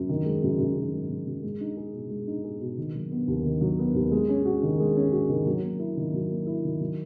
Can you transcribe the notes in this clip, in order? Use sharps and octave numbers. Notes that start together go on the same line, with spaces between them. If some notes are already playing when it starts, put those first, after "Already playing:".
Already playing: F#2
D#3
G#3
F#2
F#2
D#3
G#3
F#2
F#2
G#3
D#4
G#4
B2
G#3
D#4
G#4
B2
D#3
F#3
B3
D#2
D#3
F#3
B3
D#2
G#3
C#4
F#4
D#3
G#3
C#4
F#4
D#3
F#3
A#3
E4
D#3
F#3
A#3
E4
D#3
F#3